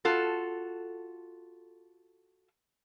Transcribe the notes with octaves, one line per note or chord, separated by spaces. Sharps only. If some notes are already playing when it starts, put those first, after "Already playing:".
F4 F#4 A4